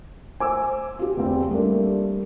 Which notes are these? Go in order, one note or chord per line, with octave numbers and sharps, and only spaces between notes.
C5 G#5 D6 E6
F4 G4
E2 C4
G3 A3 A#3 D4